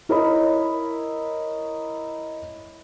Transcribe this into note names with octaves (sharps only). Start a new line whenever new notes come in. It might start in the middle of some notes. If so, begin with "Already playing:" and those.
E4 A#4 C#5 D#5 B5